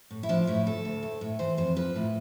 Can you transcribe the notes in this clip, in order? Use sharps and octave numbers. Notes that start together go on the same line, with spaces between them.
A2
E4
F3 D4
A2 E4
D2 A4
D2
A2
A2
E3 C5
F2 C5
F3 B4
A2